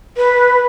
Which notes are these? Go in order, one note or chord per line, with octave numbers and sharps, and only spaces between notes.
B4